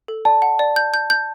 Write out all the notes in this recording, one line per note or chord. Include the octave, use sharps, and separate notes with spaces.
A4
D5 A5
F#5
D5
G6
G6
G6